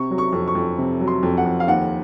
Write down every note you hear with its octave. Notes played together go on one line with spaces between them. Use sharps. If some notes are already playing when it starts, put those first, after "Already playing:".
Already playing: C3 C#6
F#3
C#6
F2
C#6
F2
C3
F#3
C6
F2
F#5
F2
F5
D#2 F#5